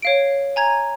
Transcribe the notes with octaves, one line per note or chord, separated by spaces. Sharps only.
C#5 F5 D7
G#5 A#5 G#6